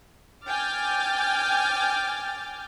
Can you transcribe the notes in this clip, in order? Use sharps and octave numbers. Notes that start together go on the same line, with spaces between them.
G5 G#5 D6 F6 G6 A6